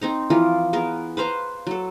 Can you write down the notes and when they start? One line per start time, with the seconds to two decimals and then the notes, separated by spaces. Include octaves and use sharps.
0.01 C4 D#4 A#5
0.30 E3 F3 F4 A#4
0.73 B3 G#4 A#4
1.17 B4 C5 F5 A#5
1.67 F#3 A4